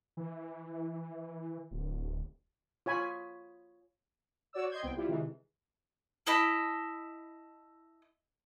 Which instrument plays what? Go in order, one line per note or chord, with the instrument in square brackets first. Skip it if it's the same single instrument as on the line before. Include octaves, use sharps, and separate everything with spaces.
[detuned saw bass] E3
D1
[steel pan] F4 C#5 G#5 B5
[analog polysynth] F#4 C#5 D5 E6
D#5 C6 G6 G#6
C2 B3 C4 G5
G3 E4 F4 G4
C3 D#3 E3 G#3
[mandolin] E4 D#5 A5 B5